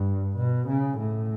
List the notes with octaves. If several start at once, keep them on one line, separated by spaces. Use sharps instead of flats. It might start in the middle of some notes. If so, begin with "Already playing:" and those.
Already playing: G2
B2
C#3
A2